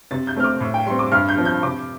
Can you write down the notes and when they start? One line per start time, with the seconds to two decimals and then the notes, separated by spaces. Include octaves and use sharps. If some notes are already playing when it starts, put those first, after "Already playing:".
0.11 C3 A6
0.27 G6
0.36 A3 C4 F6
0.44 D6
0.60 A2
0.74 G5
0.86 G3 C4 C6
0.99 D6
1.11 G2 F6
1.29 G6
1.37 F3 C4
1.45 G6
1.63 C3 D6